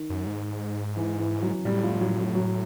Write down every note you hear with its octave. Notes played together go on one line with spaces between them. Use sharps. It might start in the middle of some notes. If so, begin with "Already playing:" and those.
Already playing: D#3
F#2
G#2
E3
E3
F#3
A2 G3
F3
F#3
F#3
F#3